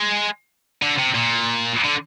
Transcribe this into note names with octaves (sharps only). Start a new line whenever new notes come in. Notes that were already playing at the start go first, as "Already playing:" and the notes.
Already playing: G#3
D3
C3
A#2
D3